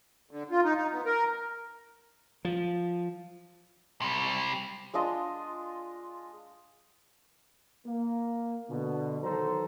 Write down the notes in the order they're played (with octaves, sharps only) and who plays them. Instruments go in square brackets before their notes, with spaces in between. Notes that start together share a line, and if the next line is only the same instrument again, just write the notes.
[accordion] D3
F4
D#4
D#4
B3
A#4
[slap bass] F3
[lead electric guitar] C3 G3
[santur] G#3 D4 F4 D#5
[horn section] A#3
B2 D3
D#3 E3 F#3 A4 C5 A#5